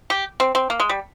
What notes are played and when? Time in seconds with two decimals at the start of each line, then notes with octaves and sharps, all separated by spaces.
0.10 G4
0.40 C4
0.55 C4
0.70 A#3
0.80 G#3
0.89 G3